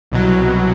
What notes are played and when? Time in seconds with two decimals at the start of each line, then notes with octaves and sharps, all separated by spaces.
0.12 C2 B2 F#3